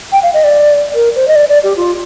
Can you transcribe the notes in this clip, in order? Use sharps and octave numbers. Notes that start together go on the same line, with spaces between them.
G5
F5
D#5
D5
A#4
C5
D#5
D5
D5
G4
F4